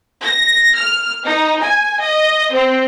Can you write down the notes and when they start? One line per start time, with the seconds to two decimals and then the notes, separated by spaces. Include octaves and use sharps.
0.23 A#6
0.76 F6
1.24 D#4
1.61 G#5
1.99 D#5
2.51 C4